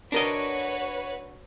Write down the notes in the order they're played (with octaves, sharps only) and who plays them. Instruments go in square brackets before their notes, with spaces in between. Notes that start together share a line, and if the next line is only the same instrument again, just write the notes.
[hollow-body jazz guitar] D4 A#4 D#5 [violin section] F#4 B4 C#5